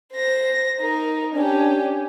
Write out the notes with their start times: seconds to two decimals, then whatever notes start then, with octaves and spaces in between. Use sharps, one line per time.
0.13 C5 A#6
0.81 D#4 A#4
1.34 C#4 D4 G4